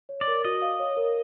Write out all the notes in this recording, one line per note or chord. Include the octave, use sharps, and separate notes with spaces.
C#5
D5
A#4
F#4 D#5
F5
C#5
A#4